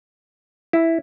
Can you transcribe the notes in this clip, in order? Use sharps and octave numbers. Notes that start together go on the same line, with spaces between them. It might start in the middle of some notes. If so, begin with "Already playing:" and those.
E4